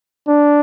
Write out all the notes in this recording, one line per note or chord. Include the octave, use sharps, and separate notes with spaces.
D4